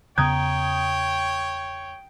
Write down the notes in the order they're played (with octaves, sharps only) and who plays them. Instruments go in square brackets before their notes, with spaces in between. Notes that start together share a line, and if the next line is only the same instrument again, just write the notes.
[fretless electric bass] E2 C#3 B3 [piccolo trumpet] C#5 [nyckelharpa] G5 [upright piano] A#5 D#6 G#6